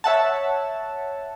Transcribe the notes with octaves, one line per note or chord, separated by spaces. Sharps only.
C#5 E5 F#5 A5